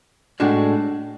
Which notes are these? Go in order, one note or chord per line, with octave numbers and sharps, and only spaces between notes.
A2 G#3 D4 F#4